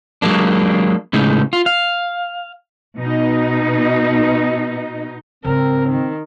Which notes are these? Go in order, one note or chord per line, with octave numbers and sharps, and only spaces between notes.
F#3 G#3 A#3 D4
A2 C#3 G#3 D#4
F4
F5
B2 D#4
G#2 C#3 C4 A#4
D#3